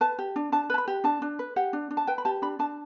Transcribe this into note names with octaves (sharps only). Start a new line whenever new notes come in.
B4 A5
G4
D4
D4 A5
B4 A5
B5
G4
D4 A5
D4
B4
G4 F#5
D4
D4
A5
B4 G5
B5
G4 A5
D4 B5
D4 A5